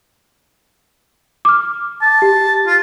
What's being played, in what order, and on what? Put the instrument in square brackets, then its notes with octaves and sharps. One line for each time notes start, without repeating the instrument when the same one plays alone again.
[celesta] D6 F6
[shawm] A5
[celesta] G4
[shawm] F4